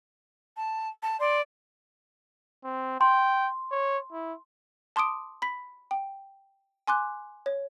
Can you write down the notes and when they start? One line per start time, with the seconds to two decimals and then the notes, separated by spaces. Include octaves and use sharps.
0.56 A5
1.02 A5
1.20 D5 C6
2.64 C4
3.01 G5 C6
3.71 C#5
4.13 E4
4.96 A5 C6 D6 D#6 D7
5.42 B5 B6
5.91 G5
6.87 G#5 C6 D6 F#6
7.46 C#5